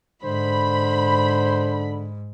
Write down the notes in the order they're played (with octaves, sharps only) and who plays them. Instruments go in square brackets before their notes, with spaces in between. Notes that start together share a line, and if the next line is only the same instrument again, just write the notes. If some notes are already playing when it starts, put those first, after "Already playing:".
[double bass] G#2 [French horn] D3 [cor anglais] C5 [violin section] B5